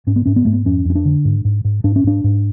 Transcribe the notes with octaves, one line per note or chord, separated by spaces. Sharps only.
G#2 C#4
B3
G#2 C#4
B3
G#2 A3
B3
F2 C#4
F2 C#4
D4
D3
G#2
G#2
G#2
G#2 D4
C#4
G#2 D4
G#2